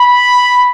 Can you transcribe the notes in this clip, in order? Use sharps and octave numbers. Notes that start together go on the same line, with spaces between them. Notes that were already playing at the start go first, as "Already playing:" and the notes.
Already playing: B5